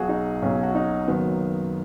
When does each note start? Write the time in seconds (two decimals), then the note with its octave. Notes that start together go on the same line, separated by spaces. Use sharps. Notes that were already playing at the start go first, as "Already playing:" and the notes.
Already playing: B1 B2 F#3 F#4 G#4
0.09 D#4
0.42 B1 B2 F#3 C#4
0.63 F#4
0.75 D#4
1.08 F#1 F#2 D#3 F#3 B3